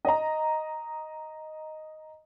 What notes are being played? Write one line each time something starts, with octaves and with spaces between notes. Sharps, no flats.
D#5 A#5